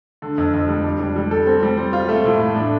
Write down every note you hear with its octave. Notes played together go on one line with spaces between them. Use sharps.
D3
F2
F2
G3
D4
G3
G3
A4
C4
G3
C5
F4
A3
A2
A2
D4